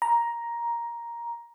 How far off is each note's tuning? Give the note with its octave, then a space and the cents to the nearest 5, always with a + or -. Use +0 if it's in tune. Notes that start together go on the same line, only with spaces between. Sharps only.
A#5 +10